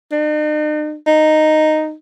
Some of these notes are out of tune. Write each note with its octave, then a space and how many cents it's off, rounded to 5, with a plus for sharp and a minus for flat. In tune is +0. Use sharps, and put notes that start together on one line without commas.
D#4 -45
D#4 -5